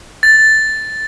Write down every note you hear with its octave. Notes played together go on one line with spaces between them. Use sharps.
A6